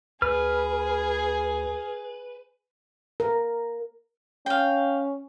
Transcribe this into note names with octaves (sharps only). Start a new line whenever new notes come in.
D2 G#4 B4 F6
A#4
C#4 F5 G5